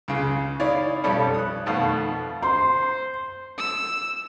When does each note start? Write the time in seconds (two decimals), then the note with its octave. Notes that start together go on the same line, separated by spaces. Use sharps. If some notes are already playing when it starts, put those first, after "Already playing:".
0.08 C#2 C#3
0.60 D#4 E4 C#5 D5 F5
1.03 B1 F2 G3 C#4 A4 B5
1.34 D#6 F#6
1.66 F2 B2 D#3 A3 F5
2.43 C5 C6
3.58 E6